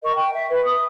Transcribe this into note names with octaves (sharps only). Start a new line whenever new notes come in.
A#4 D#5 C#6
G5
E5
B4
D#6